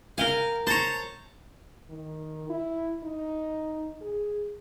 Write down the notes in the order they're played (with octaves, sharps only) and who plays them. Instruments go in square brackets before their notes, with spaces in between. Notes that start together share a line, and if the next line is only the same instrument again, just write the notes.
[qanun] A#4 G5 G#5 [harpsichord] F5
[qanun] C5 C#5 [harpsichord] A5 A#5
[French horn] D#3
E4
D#4
G#4